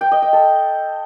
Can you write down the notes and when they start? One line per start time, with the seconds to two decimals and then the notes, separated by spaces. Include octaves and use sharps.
0.01 G5
0.12 D#5
0.22 G5
0.33 A4